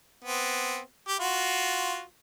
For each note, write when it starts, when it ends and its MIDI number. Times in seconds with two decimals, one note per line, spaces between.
0.24 0.79 59
0.24 0.79 60
1.08 1.17 67
1.20 2.01 65
1.20 2.01 66